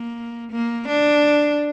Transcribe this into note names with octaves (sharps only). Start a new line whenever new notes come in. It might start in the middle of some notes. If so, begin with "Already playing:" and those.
Already playing: A#3
A#3
D4